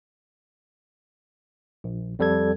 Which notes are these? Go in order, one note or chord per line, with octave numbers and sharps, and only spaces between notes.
A#1
F2 G3 A4 G#6